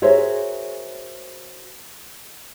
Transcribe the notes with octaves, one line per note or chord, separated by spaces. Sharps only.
F#4 G#4 A#4 C5 C#5 E5